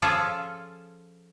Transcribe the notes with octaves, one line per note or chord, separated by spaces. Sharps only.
F3 C#4 F4 G#4 A4